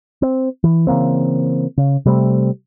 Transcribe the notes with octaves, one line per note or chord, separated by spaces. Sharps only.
C4
E3
C#3 E3 A#3 C4
C#3
C3 G3 A3 C4